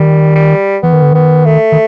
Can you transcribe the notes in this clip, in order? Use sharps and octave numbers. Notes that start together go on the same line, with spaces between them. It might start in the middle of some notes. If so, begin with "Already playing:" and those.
Already playing: D#3 G3
G3
E3 B3
D#3
D3
D#3 B3
A3
D#3